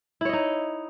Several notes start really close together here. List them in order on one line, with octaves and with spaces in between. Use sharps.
E4 C#5 D#5 D#4